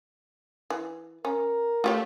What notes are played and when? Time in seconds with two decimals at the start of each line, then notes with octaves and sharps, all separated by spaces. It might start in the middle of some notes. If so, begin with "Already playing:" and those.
0.70 E3
1.25 C#4 A#4
1.84 A3 F4 G4 C#5